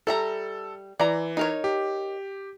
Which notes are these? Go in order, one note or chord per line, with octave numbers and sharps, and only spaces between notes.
G3 A4 E5 A#5
E3 D5 A#5
D#4 A#4 C#5
G4